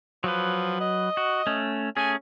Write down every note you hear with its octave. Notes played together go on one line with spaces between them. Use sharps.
F3 F#3 B4
D#5
F#4
A3 C#4
A3 C#4 G#4 G#5